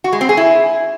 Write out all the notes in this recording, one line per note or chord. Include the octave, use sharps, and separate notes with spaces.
F#4
G#3
C4
G#4
E4